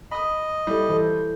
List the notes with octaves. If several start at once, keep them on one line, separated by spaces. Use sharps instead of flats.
D#5 B5 D#6
G3 E4 A4
E3 A4 C5